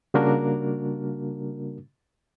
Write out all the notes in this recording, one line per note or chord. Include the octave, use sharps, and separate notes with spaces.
C#3 G3 A#3 D4 F#4 A#4